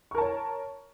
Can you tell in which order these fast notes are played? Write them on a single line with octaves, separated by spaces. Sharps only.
C#6 A#4 A5 C#5